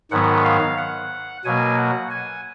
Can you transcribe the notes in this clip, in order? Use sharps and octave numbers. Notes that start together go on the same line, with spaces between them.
G#2 D#3 F#3 B3 F#5
F5
F#5
B2 F#3 A#3 G#5
F#5
G#5